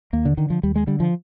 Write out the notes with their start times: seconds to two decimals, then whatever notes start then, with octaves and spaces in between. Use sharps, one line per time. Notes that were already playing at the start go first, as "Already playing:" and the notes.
0.13 D#2 A#3
0.25 D3
0.37 D3 D#3
0.50 F3
0.63 D#2 G3
0.76 G#3
0.87 D3 G3
1.00 F3